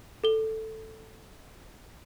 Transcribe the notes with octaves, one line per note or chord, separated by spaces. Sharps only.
A4 G7